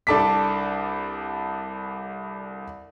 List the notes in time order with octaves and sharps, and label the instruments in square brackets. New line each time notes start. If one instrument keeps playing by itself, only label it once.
[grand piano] C2 D4 A4 A5 D6 B6